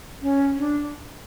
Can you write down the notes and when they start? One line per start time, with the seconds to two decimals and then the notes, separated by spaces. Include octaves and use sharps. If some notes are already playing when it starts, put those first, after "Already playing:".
0.22 C#4
0.57 D4